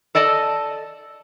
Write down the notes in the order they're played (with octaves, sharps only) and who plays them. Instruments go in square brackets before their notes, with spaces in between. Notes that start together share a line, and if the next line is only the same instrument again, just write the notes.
[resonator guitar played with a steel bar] A4 D5 D#5 A5